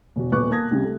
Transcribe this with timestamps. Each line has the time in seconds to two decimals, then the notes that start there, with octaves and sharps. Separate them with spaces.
0.16 E1 F#4
0.32 D#1 B2 B4 C#6 D6 F#6
0.50 A#3 A5 D#6 G#6 A#6
0.71 C2 C#3 G3
0.84 A3